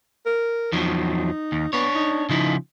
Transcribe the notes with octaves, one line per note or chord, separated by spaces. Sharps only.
A#4
E2 F3 F#3 D#4
D#2
B3 D4 C#5
D#4
C#3 F3 D#4 E4